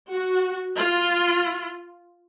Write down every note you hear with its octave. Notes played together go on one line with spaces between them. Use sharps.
F#4
F4